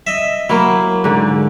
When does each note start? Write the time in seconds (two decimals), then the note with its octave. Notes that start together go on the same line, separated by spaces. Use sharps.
0.07 D#5 E5
0.49 F#3 A#3 E4
1.04 G#2 D3